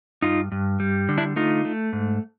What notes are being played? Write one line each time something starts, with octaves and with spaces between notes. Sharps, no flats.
G2 D#4 F4
G2
G3
D3
D4 E4
A3 D#4 F4
A3
G#2